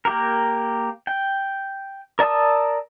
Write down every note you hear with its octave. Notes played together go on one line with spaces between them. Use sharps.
A#3 G4 A#4
G5
A#4 D5 A5 D#6 E6